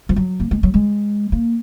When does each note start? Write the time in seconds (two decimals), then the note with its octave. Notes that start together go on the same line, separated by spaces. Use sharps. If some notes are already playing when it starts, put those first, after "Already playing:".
0.09 F3
0.16 F#3
0.40 A#3
0.51 G#3
0.63 F#3
0.74 G#3
1.32 A#3